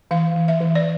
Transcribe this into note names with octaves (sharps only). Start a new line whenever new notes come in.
E3 F5
E3
E5
E3
D5